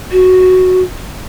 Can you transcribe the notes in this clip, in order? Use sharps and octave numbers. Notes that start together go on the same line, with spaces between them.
F#4